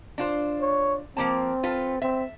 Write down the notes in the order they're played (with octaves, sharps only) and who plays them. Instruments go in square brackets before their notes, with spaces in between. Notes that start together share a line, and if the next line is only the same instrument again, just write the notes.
[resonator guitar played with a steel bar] D4 F4 C5
[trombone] C#5
[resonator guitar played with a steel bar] F3 A#3 A5 [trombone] C4
[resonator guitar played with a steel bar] F4 A4 B4
[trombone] C4 [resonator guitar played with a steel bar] E5